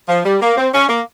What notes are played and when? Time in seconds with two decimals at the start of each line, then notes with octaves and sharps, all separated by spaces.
0.08 F3
0.25 G3
0.42 A#3
0.57 C4
0.74 C#4
0.89 A#3